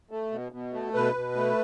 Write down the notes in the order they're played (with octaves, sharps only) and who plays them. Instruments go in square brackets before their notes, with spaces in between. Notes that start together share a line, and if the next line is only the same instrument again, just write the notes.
[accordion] A3
B2
B2
A3
B2 B4
B2
A3